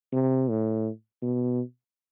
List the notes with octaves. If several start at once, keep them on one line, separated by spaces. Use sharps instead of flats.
C3
A2
B2